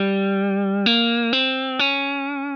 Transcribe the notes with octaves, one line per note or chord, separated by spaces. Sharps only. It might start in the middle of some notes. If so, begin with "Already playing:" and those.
Already playing: G3
A#3
C4
C#4